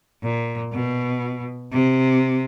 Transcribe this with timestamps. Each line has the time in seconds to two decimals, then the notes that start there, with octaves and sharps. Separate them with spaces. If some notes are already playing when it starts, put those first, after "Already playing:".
0.23 A#2
0.73 B2
1.72 C3